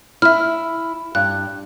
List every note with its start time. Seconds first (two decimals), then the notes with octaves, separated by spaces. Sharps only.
0.22 E4 E5 F6
1.15 G2 F#6